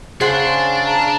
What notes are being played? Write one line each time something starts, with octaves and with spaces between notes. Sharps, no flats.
C#3 D4 G#4 C5 F#5
A5 A#5